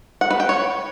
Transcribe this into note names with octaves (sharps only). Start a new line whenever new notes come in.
F#5
B4
G5
C#5